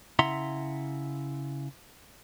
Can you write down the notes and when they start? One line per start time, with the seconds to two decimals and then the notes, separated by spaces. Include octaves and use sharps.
0.19 C#3 E4 E5 F#5 A#5 C6